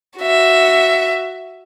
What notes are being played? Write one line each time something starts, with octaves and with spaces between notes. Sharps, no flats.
F#4 E5